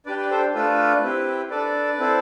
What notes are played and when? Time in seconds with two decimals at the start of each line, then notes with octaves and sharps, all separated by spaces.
0.06 D4 G4 B4 D5
0.19 B4 D5
0.31 A4 C5
0.54 A3 D4 F4 A4 B4
1.02 C4 E4 G4
1.50 D4 A4 B4 D5
1.99 C4 E4 A4